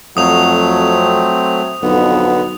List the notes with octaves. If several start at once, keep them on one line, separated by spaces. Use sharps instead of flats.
F2 F#3 A3 F#4 D#6 F7
C4
B1 F2 D3 B3